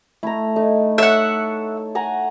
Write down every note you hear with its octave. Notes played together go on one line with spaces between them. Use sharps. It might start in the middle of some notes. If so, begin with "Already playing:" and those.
A3 E4 A#5
A3 D#4
A4 C#5 E5 F#5
F#5 G#5 A#5